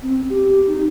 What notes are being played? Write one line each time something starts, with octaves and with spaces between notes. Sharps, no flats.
C4
G4
D#4